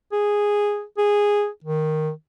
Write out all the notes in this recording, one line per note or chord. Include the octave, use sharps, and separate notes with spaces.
G#4
G#4
D#3